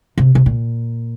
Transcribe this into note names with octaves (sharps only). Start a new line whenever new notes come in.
C3
C3
A#2